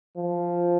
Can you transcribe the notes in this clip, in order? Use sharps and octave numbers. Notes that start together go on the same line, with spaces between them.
F3